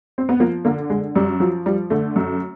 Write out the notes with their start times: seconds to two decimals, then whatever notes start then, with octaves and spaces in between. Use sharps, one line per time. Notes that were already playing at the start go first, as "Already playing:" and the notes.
0.18 C4
0.29 B3
0.40 F3 A#3
0.65 D3 A#3
0.90 D3 G#3
1.16 F#2 G3
1.40 F3 F#3
1.66 F3 G3
1.90 D3 A3
2.16 F#2